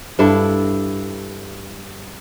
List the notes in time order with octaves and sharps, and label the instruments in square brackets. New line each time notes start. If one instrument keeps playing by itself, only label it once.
[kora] G2 D4 E4 A4